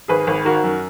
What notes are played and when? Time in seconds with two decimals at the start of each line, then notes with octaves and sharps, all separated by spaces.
0.08 G#1 G#4 B4
0.27 G#1
0.45 D#3 F#4 A#4
0.64 F#2